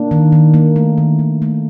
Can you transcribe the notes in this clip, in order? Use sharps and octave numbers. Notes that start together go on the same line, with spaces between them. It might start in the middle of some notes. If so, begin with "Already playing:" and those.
Already playing: A#3 D4
D#3
D#3
A#3
A3
D#3
D#3
A3